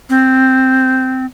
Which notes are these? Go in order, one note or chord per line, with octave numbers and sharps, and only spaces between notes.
C4